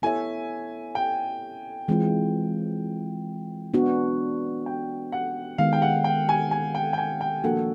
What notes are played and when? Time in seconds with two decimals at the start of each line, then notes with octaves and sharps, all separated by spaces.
0.02 B3 E4 A4 C#5 E5 G#5
0.95 G5
1.88 E3 G#3 C4 F4
3.74 B3 D4 F#4
4.66 G5
5.12 F#5
5.58 D#3 G#3 B3 F5
5.73 G5
5.82 F#5
6.04 G5
6.29 G#5
6.51 G#5
6.75 G5
6.93 G5
6.98 G#5
7.21 G5
7.43 F3 A#3 D4 F#4 A4 F#5